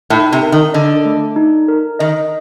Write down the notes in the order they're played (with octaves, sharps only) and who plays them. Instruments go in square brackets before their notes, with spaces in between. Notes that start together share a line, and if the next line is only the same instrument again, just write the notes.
[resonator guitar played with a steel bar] A2 [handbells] D#4
[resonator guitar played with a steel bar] C3
[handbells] A#4
[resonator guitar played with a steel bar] D#3
[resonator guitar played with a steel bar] D3 [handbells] D#5
[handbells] A3
D#4
A#4
[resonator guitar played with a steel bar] D#3 [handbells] D#5